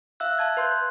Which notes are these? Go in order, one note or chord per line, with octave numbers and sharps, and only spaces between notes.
E5 F5 E6 F#6
F5 A5 G#6
B4 C6 F#6 G6